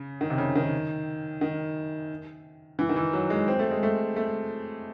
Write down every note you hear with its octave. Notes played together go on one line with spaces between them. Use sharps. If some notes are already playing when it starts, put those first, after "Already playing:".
Already playing: C#3
D#3
C3
C#3
D#3
D#3
E3
D#3
E3
F#3
G#3
C4
A3
G#3
A3
A3